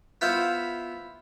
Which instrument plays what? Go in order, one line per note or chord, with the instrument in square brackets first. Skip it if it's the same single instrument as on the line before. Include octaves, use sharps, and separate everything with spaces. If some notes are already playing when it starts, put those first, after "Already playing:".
[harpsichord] B3 E4 F4 C5 F5